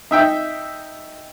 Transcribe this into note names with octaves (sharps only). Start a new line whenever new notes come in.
D#4 E5 G5